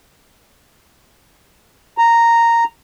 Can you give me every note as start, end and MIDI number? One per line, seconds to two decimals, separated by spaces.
1.98 2.64 82